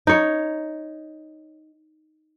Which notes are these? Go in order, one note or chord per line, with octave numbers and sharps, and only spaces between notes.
D#4 C#5